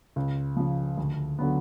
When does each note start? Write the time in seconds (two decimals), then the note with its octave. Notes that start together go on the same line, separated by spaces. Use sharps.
0.16 C#2
0.56 C#3 F3
0.97 D2
1.39 D3 F#3 B3